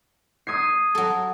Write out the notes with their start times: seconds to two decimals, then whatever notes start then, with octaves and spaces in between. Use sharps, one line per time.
0.47 D#6 G#6 C7
0.95 F#3 A4